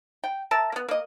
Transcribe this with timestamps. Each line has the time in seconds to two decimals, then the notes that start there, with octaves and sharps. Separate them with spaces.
0.24 G5
0.51 A#4 E5 A5
0.72 A#3 B3
0.88 A#3 D#5